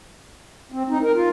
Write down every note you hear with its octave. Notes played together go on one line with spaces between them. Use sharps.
C4
D#4
A#4
F4